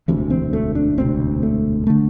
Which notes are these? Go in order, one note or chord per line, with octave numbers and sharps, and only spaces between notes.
E1 D2 C3 E3
C4
A3
D4
E1 D2 C3 C4
A3
D3 A3